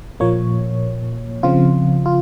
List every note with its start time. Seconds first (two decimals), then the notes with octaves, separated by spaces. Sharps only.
0.20 A#2 F3 A#3 C#5
1.43 C#3 F3 C4 F4
2.06 F4